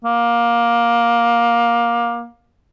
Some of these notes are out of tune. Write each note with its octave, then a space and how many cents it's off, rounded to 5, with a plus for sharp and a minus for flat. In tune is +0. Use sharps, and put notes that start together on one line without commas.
A#3 +15